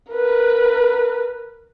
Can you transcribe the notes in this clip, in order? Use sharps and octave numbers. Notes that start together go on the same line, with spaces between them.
A#4 B4